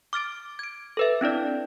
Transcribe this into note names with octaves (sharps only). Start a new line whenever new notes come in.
D6 F6 A6 D7
G#6 D7
A4 B4 E5
C4 D4 E4 D5